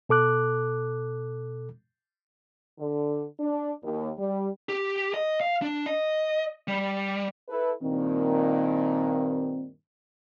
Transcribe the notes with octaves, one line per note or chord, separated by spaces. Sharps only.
B2 A4 D6 F#6
D3
D4
D#2
G3
G4
D#5
F5
D4
D#5
G3
E4 A4 B4
G2 A#2 D#3 C4